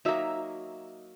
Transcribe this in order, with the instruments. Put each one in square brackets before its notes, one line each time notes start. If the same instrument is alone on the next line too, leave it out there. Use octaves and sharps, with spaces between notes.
[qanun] F#3 A#3 [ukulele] D#4 E5